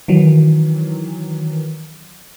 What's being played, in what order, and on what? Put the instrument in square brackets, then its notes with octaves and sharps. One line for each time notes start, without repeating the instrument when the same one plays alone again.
[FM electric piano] D#3 E3 F#3